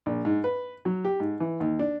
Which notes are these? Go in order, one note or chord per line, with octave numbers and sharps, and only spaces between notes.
A#1
G#2
B4
F#3
G4
G#2
E3
D#2
D4